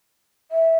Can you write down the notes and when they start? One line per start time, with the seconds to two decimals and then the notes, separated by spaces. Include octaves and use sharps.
0.51 E5